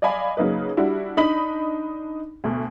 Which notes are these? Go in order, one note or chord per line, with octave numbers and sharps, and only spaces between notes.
D5 D#5 F5 G#5 B5
C#3 F#3 A#3 D#4 B4
G3 D4 E4 F#4
D4 D#4 B5 B6 F#7
D2 B2